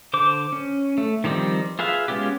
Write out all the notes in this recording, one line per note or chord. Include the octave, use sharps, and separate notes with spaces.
D3 C5 D6
C#4
A3
D#3 F3 G3 C4 D#4
F4 G#4 B4 E5 F5
G#3 B3 C#4 F4 G4